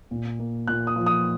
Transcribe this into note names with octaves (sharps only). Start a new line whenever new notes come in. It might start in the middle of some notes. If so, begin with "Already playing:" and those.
A#2
A#3
A#2 F#6
D#6
F3
D#6